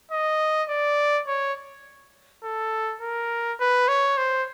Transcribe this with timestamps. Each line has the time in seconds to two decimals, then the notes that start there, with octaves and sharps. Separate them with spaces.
0.11 D#5
0.69 D5
1.27 C#5
2.44 A4
3.01 A#4
3.60 B4
3.88 C#5
4.18 C5